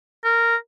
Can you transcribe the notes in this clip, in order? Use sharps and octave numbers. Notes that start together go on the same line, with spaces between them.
A#4